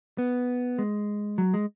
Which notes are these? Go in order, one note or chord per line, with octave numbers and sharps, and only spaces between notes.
B3
G#3
F#3
G#3